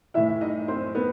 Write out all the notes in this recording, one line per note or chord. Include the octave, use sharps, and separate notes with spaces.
A2 E3 E4 E5
D#4 D#5
C4 C5
B3 B4